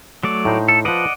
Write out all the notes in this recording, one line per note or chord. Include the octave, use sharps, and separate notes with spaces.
F#3 A3 D5
A2 D#4 C5
A4
F3 B4 D5 D#5 F#5